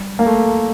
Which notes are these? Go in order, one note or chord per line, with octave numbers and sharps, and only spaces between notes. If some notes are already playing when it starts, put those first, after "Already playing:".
Already playing: G3
A#3
A3